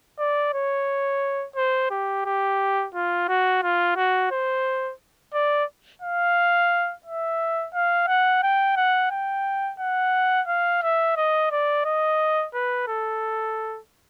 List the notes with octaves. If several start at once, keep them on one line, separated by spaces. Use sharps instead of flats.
D5
C#5
C5
G4
G4
F4
F#4
F4
F#4
C5
D5
F5
E5
F5
F#5
G5
F#5
G5
F#5
F5
E5
D#5
D5
D#5
B4
A4